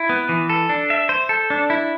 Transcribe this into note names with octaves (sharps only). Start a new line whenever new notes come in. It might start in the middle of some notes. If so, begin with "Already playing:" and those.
Already playing: E4
B3
E3
A4
D4
E5
C5
A4
D4
E4